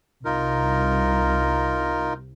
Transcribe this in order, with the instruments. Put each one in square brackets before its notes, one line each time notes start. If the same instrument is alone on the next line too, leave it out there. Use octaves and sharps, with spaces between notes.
[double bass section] C2 [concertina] D#4 F4 A#4